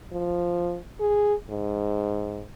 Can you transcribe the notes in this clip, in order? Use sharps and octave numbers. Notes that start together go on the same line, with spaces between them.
F3
G#4
G#2